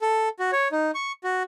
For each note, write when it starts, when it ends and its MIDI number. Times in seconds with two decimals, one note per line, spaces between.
0.02 0.29 69
0.39 0.51 66
0.52 0.68 73
0.72 0.91 63
0.95 1.12 85
1.24 1.43 66